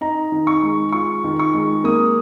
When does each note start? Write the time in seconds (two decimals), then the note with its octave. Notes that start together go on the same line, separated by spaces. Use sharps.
0.01 D#4 A#5
0.32 D#3
0.47 C#6
0.63 G#3
0.92 F4 C#6
1.24 D#3
1.39 C#6
1.54 G#3
1.84 A#3 D#6